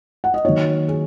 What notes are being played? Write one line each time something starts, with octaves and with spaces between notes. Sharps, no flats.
F#5
D#5
D#3 F#3 A#3 D#4 C#5
G#4